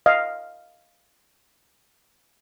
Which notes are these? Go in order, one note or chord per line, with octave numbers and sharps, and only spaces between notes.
D#5 F5